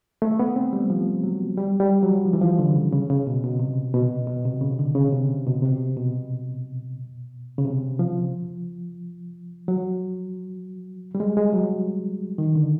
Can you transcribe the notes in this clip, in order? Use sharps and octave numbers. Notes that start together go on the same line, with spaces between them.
A3
B3
C4
G3
F3
F#3
G3
G3
F#3
F3
E3
F3
D3
C#3
C#3
C#3
B2
B2
C3
B2
B2
C3
C#3
D3
C#3
C3
B2
C3
B2
C#3
C3
F3
F#3
G3
G#3
G#3
F#3
D#3
D3